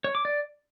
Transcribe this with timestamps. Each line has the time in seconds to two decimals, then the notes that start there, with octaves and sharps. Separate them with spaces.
0.04 C#5
0.15 D6
0.25 D5